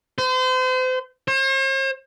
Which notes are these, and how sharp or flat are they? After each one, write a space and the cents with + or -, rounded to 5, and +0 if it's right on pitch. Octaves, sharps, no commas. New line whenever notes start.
C5 -35
C5 +45